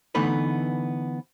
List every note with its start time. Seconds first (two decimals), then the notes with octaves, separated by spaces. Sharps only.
0.15 D3 E3 A3 B3 D#4 B4